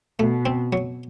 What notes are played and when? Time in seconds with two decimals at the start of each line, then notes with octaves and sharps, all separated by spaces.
0.19 B2 A3
0.46 C4
0.73 F#3